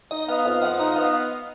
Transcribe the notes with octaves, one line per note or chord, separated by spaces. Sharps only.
D#4 D#5
B3 F5
F2 F5
F3 D#5 F#5
D#4 D#5
B3 F5